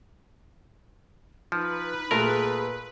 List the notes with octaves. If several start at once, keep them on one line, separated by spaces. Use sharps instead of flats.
F3 D#4 B4
A#2 A3 G#4 A#4